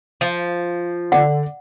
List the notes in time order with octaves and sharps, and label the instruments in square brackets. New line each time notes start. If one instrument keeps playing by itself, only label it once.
[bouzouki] F3
[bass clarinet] D3 [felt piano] D5 [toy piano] F#5